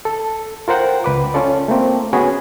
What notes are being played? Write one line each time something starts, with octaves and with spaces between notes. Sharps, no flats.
A4
F4 A#4 C5 F#5 G5
C#2 B4 D6
C#4 F4 A4 D5
A3 A#3 C4
B3 C#4 F#4 G#4 G#5 B5